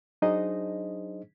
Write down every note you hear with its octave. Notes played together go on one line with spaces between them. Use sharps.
F#3 D4 D#4 G#4 C5 D#5